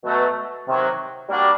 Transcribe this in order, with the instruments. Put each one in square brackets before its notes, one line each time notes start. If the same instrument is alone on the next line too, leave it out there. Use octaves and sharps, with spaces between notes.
[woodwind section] B2 F#3 A3
C3 D#3 F#3
G3 A#3 D4 F#4